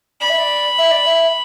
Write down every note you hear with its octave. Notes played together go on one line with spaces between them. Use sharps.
D5 B5
E5
D5
E5
D5
E5